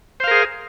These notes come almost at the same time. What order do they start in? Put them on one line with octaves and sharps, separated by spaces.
C5 F5 A#4 G#4